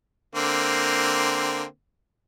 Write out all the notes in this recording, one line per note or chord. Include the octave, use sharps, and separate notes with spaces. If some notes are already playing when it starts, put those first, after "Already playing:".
D3 A#3 C4